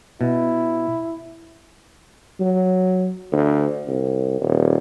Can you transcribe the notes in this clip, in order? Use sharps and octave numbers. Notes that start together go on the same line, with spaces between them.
B2 E4
F#3
D2
C2
D#1